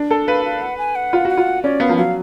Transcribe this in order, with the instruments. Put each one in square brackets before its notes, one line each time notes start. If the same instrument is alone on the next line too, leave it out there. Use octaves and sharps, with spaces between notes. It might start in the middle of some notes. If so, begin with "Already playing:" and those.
Already playing: [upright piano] D4
A4
[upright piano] B4 [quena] F5
[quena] F5
F#5
G#5
F#5
[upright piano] F4
[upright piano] F#4 [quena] F#5
[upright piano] F4
[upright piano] C#4 [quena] D5
[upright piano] B3 [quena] F5
[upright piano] F3
[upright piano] F#3 [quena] F5